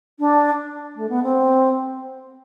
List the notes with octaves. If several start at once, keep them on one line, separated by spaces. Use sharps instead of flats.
D4
A3
B3
C4